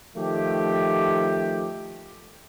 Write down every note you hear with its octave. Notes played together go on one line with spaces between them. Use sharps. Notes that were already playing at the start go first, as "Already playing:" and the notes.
D#3 F3 A3 G4